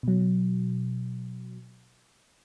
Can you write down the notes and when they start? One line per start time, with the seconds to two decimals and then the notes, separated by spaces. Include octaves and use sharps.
0.03 B2 F#3